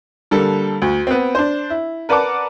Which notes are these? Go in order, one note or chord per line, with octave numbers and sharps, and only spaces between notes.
D3 G3 A#3 A4
D2
B3 C4
D4 C5
E4
A#4 B4 D5 F#5 A5 D6